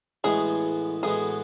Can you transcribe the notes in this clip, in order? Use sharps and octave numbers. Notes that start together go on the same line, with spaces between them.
A1 A2 G#3 B3 F#4 G#4
A1 A2 G#3 B3 F#4 G#4